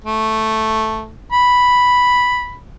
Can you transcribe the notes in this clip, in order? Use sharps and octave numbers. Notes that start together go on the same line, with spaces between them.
A3
B5